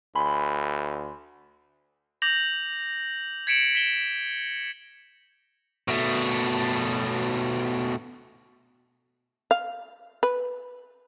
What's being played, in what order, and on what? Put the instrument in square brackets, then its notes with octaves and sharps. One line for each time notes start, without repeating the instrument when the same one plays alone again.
[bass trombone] D2 [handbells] G#5 B5 C6
[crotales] D6 G6 A#6 F7 F#7
G#6 B6 C#7 D7 E7 F#7
B6 E7 G7
[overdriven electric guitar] B2 A3
[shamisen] F5
B4